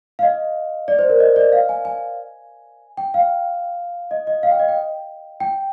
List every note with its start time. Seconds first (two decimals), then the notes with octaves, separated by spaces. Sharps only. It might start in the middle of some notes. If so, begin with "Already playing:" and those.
0.19 F5
0.23 D#5
0.88 D5
0.99 C5
1.09 A#4
1.20 D#5
1.36 D5
1.52 F5
1.69 G#5
1.85 G#5
2.97 G5
3.14 F5
4.11 D#5
4.27 D#5
4.43 F5
4.51 G5
4.59 D#5
4.68 G5
5.40 G5